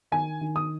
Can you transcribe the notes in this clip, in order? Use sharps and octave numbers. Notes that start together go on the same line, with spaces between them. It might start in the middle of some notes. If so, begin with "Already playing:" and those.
D#3 G#5
D#3
D#6